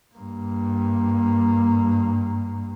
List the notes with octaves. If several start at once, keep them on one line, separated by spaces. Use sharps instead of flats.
G2 A#3